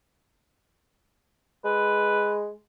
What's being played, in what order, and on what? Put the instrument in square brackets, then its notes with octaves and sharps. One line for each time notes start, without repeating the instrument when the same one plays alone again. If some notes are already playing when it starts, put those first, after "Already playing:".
[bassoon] G#3 [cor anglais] B4